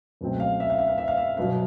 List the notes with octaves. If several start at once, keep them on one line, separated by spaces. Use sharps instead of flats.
C#2 B2 F#3 A3 C4
F5
E5
F5
E5
F5
E5
F5
E5
C2 B2 F#3 F5